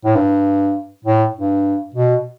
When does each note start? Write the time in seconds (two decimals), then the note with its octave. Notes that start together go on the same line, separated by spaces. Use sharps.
0.05 A2
0.16 G2
1.05 A2
1.35 G2
1.94 B2